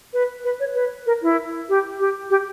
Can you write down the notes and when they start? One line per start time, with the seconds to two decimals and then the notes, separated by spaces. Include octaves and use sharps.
0.13 B4
0.44 B4
0.60 C#5
0.75 B4
1.06 A#4
1.22 E4
1.69 G4
1.99 G4
2.30 G4